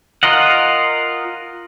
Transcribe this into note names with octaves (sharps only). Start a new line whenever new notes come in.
F4 A#4 D#5 F#5